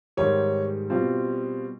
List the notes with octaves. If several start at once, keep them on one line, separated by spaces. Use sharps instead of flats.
G#2 D#3 G3 C#5
B2 G3 C4 F4